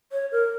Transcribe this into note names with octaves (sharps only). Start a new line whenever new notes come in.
C#5
A#4